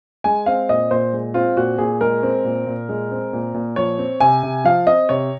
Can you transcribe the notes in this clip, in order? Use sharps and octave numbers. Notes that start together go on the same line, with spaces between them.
G#3 G#5
C4 F5
A#2 D#5
A#2 C5
G#3
C4 F4
A#2 F#4
A#2 G#4
G#3 A#4
C4
A#2
A#2
G#3
C4
A#2
A#2
F3 C#5
C4
C3 G#5
C3
F3 F5
C4 D#5
C3 C#5